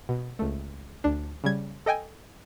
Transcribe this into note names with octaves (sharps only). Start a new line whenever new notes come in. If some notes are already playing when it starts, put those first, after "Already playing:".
B2
C#2 A3
D2 D4
C#3 G3 G#6
A4 D#5 G5 G#5